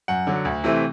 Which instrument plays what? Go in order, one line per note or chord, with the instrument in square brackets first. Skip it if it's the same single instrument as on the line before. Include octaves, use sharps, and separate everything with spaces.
[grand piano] F#2 F#5
D3 F#3
D2
C3 E3 A3 C4